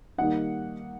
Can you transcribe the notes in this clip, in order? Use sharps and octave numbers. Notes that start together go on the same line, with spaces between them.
D#3 G3 A#3 D#4 F#5